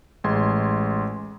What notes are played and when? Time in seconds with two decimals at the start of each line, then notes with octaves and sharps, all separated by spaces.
0.24 A1 G#3 C6 G#6